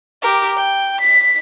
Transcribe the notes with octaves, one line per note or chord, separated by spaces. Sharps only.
G4 A#4
G5
B6